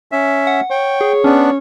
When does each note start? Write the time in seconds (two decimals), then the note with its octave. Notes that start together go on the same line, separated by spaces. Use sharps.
0.12 C#4 E5
0.47 F#5
0.70 C#5 G5
1.01 G#4
1.24 B3 C#4 D4